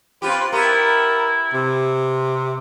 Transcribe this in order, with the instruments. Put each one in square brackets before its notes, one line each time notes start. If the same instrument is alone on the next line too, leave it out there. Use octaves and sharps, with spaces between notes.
[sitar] C4 F4 G4 [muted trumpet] B4
[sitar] B3 G4 [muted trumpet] E4 [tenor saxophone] A#4
[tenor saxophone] C3